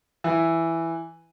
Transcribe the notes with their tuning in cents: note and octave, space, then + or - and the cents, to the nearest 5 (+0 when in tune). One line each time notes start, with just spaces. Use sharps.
E3 +5